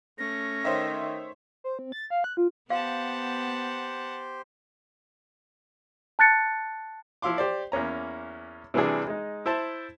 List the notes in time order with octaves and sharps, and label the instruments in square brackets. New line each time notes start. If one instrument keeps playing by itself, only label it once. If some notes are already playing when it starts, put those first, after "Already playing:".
[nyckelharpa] A3 C#4 [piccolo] A#6
[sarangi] D#3 [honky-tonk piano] C5 C#5 E5
[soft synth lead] C5
C4
A6
F5
F#6
F4
[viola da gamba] B3 [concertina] G4 C5 [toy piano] F5 [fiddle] F#5 A5
[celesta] A5 F#6 A6 C#7
[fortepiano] F3 E4 F5 C6 D6
G4 C5 D5
E2 A#3 C#4 A#5
C3 E3 G3 D4 G#4
G#3 D#4
E4 C5 E5 A5